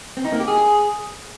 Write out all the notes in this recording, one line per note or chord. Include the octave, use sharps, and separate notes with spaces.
C4
D#4
A#3
G4
G#4